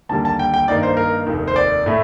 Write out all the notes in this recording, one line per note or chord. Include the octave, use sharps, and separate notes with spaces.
D#2 D3 G3 A#3 A5
A5
G5
G5
G2 D#3 A#3 D#4 D5
C5
A#4
F1 D#2 D#3
C5
D5
A2 A3